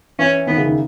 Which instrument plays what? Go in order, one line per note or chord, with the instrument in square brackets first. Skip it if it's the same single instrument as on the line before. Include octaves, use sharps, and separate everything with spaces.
[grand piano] E3 [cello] C#4
[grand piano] D#3 [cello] B3
[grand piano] C#3
D#3